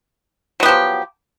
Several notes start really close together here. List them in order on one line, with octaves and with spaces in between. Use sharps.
F#3 B3 G4 F3